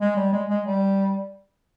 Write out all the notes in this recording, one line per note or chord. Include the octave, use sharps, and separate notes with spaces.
G#3
G3
G#3
G#3
G3